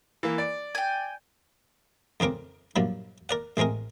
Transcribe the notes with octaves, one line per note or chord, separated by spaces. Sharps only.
E3 A#3
D5
G5 G#5
F2 C#3 C4 A#4 D6
G2 A#2 F3 F#3
A#4 D5 F#5
A1 G#3 C4 G#4 A#4